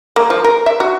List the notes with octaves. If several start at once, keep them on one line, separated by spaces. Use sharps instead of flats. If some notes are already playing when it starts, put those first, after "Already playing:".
A#3
F3
A#4
E5
F#4